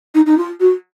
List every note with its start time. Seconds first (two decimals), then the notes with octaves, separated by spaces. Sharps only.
0.15 D#4
0.26 D#4
0.38 F4
0.60 F#4